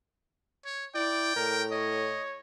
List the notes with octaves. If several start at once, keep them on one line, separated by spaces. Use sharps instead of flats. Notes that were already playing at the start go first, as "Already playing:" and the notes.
C#5
E4 D5 G5
A2 A#4
C#5 D#5